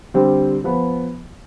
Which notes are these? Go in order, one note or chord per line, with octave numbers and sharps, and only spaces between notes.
D3 G3 C4
F3 B3